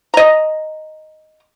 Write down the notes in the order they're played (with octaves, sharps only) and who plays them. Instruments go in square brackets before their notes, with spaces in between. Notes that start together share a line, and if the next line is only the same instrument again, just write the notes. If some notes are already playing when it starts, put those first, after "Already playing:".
[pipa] D#5 A#5